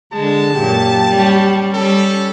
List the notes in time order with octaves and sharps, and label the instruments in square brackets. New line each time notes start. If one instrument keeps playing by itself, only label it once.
[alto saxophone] D3 [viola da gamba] G#3 [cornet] A5
[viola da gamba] F#2 A#2 [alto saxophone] G4
[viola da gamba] G3 C#4
[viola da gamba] G3 C#4 [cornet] A4